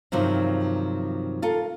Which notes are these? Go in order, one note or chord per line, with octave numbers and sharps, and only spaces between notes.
G2 C3 D#3 F3 F#3
F4 A4 A#4